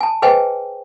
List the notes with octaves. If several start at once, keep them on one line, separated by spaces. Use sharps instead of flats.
G#5 A5
G#4 B4 C5 D#5 G5 G#5